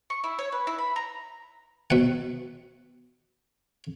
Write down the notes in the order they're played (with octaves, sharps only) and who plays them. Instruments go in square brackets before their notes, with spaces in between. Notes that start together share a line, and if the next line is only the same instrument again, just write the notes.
[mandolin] C#6
E4
C#5
B4
E4
B5
A#5
[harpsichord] B2 F#5